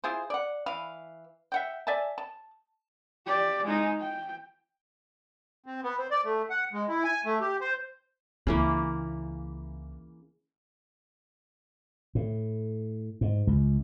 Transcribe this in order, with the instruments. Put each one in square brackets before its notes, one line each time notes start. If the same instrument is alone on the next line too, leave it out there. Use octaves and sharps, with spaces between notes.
[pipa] E4 F4 G#4 C5
D5 F#5
E3 F5
E5 F#5 G5
D5 E5 G#5 A5
A5
[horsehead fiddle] G4 D5
G#3 D#4
G5
[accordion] C4
B3
C4
D5
A3
F#5
G#3
E4
G#5
A3
G4
C5
[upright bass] C#2 D4 [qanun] C#3 E3 A#3
[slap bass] A2
G#2
C#2